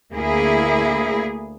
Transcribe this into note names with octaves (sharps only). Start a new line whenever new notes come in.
D2 A#3 E4 G#4